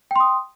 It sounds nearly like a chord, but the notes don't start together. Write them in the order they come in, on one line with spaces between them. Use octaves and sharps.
G5 C6 D#6